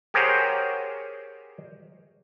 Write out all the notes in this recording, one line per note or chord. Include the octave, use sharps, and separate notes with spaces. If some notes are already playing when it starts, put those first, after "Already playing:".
G4 G#4 A#4 C5 C#5 F#5